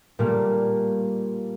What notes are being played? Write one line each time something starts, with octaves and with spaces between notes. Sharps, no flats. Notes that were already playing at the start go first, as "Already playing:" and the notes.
A#2 G3 A3 A#3